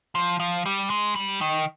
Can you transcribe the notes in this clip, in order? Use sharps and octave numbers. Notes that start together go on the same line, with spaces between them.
F3
F3
G3
G#3
G3
D#3